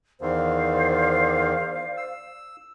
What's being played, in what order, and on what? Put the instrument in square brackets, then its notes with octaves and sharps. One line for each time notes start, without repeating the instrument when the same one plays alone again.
[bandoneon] E2 D#3 [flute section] C5 D5 F5
[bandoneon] E6